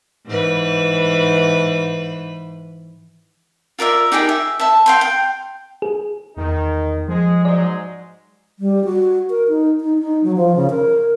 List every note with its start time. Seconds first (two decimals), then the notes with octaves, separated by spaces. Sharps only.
0.26 G#2 E3 B4
3.79 F4 A#4 D5 E5
4.12 D#4 G4 G#4 A#4
4.29 E5
4.60 E5 A5
4.86 F5 G5 C6
5.01 G5
5.82 G#4
6.36 E2 D#3 D#4
7.08 F3 G#3 G#4
7.45 G#2 F#3 G#3 D5
8.59 G3
8.85 F#4
9.30 A#4
9.48 D#4
9.80 D#4
9.99 D#4
10.24 F#3
10.36 F3
10.56 C#3
10.70 A#4